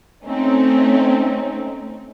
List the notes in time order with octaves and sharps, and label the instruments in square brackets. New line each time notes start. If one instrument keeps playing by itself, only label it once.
[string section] A3 C4 C#4 D#4